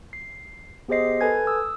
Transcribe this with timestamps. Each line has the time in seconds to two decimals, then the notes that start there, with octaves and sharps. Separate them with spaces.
0.13 C7
0.88 B3 G4 G#4 C5 D#5 C7
1.21 A4 B4 G#5 G#6
1.47 D#6 E6